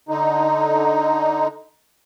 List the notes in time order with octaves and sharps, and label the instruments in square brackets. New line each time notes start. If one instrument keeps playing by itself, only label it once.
[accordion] D3 D#4